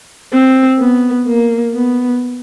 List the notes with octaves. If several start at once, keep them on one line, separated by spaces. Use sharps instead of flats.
C4
B3
A#3
B3